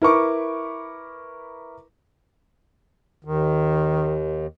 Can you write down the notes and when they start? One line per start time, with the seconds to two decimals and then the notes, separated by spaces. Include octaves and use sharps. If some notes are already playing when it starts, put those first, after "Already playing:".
0.02 E4 A#4 B4 C#6 D6
3.24 D#2 D#3